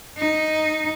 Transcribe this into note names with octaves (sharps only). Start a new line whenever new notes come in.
D#4